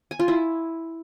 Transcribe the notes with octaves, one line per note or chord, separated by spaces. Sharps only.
G#5
F4
E4